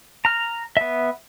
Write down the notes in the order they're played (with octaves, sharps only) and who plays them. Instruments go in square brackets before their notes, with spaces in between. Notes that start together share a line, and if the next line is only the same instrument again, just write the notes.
[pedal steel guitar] A#5 F6
B3 E5